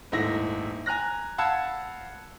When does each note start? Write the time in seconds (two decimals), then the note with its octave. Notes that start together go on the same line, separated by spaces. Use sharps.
0.12 D#1 G#2 A3 E4 E5 A#6
0.86 G#5 A#5 F#6 A#6
1.38 F5 F#5 A5 B5 E6 G#6